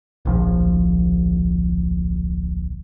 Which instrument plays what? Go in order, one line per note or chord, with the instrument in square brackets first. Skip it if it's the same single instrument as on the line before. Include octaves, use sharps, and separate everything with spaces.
[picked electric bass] D1 A#1 F3